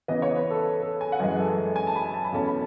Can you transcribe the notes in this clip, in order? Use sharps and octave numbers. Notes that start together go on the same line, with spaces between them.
C#3 E3 B3 D#5
C#5
B4
A4
A4
G#5
F#5
F#2 E3 G#3 G#5
A4
A4
G#5
A5
B5
A5
B5
E2 B2 A3 C#4 A5
B5